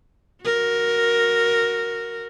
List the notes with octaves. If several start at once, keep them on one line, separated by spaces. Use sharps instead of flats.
F#4 A#4